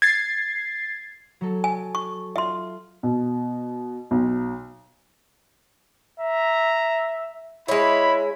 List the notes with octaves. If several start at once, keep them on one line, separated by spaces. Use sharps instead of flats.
G#6 A6 C7
F#3 A4
G#5
C#6
F4 E5 C6
B2
B1
E5 A#5
G#3 E4 C#5 B5